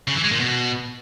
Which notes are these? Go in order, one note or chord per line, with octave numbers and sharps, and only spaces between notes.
C#3
E3
G#3
A#2
B2